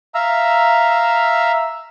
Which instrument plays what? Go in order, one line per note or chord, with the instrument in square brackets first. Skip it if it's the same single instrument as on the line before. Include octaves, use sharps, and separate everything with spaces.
[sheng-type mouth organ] E5 F5 A#5 E6